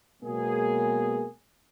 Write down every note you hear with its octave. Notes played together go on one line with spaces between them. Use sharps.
B2 F#3 G#3 A#3 B3 G#4